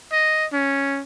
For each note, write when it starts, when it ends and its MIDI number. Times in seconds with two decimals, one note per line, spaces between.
0.12 0.45 75
0.53 1.02 61